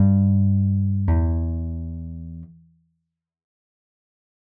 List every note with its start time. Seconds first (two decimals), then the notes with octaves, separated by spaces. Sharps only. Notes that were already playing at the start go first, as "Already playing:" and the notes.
Already playing: G2
1.08 E2